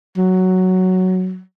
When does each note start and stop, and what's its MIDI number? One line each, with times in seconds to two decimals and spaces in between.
0.18 1.41 54